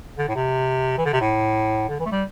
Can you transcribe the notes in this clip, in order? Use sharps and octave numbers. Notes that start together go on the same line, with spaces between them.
D3
A2
C3
E3
D3
C3
A2
D3
E3
A3
G3